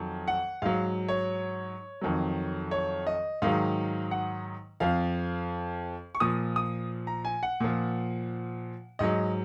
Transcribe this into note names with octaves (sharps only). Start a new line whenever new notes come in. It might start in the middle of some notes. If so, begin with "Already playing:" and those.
Already playing: F2 D#3 F#3
F#5
G#2 F#3 F5
C#5
F2 D#3 F#3
C#5
D#5
G#2 D#3 F#3 F5
F#5
F2 F3 F5
C#6
A#2 F3 D#6
D#6
A#5
G#5
F#5
A#2 F3
G#2 F#3 D#5